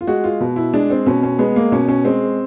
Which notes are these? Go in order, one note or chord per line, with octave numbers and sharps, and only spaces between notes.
F4
G#3 F#4
F4
B2
E4
G#3 D4
C4
B2 C#4
C#4
G#3 B3
A#3
B2 C#4
C#4
G#3 C4